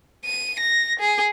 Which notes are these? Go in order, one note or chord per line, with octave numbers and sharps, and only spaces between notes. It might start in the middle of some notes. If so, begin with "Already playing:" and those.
D#7
A#6
G#4